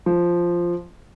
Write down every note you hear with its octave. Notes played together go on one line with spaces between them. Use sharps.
F3